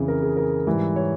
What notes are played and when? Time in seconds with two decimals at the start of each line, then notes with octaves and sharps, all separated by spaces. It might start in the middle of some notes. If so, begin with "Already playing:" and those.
Already playing: F2 C#3 E3 G#4
0.08 A#4
0.23 G#4
0.37 A#4
0.67 G#2 E3 G3
0.96 C#5